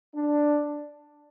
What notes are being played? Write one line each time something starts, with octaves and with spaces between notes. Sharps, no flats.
D4